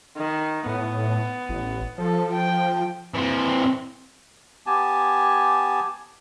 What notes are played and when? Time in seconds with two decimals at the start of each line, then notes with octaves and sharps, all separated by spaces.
0.17 D#3
0.66 A2 B3
1.49 A1
1.98 F3 A4
2.32 G5
3.15 E3 C4
4.66 B3 G4 G#5 A5